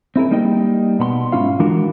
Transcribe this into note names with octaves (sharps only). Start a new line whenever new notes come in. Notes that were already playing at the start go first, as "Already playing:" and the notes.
C4 E4 G#4 A#4
G3 A#3 D#4 D#5 G5
B2 B3 B5 C6
G#2 C#4 E4 F4 F5
D#3 E3 G#3 D4 F#4 A#4